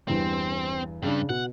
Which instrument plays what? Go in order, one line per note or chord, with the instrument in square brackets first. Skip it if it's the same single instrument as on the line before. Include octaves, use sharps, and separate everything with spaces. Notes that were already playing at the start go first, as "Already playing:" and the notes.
[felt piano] E2 G2 [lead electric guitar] C4
[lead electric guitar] G2 G3 [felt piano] C#3 D4
[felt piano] B2 [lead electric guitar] F#5